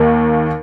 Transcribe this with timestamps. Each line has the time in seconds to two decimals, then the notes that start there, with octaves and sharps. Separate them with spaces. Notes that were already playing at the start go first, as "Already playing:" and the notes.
Already playing: D#2 D#3 A#3